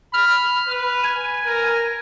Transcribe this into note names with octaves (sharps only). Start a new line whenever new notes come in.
B5 F6
B4
G#5
A#4